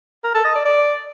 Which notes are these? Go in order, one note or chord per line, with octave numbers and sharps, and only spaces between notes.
A#4
A4
D#5
D5
D5